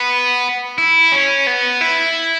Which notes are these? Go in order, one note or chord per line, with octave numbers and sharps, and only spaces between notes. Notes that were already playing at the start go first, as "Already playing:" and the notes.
Already playing: B3
E4
C#4
B3
E4